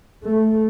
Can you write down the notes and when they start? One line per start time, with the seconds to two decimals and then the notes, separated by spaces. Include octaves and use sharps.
0.24 A3